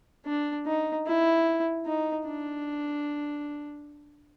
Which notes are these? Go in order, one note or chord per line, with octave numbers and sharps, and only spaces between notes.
D4
D#4
E4
D#4
D4